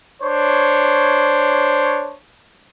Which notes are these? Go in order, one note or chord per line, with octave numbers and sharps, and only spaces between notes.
D4 C5 C#5